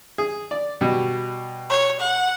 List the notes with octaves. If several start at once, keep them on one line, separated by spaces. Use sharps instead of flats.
G#4
D5
B2 G3 F#4
C#5
F#5